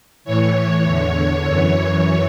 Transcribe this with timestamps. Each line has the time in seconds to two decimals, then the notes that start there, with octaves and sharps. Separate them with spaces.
0.25 A2 E3 C#5
0.85 E2 D3
1.47 F#2 E3